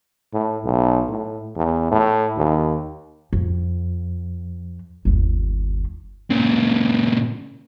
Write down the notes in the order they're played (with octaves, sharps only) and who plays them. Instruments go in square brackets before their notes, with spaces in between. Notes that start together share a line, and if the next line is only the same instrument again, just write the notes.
[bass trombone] A2
B1
A2
E2
A2
D#2
[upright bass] F2
G1 D#2
[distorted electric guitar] A#2 C#3